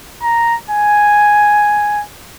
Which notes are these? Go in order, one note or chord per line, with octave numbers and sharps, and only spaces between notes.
A#5
G#5